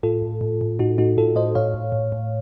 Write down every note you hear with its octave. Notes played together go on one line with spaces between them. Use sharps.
A2 F4 A4
A2
A2
A2
A2 D#4 F#4
A2 D#4 F#4
A2 F4 A4
A2 C5 D#5
A2 C#5 F5
A2
A2
A2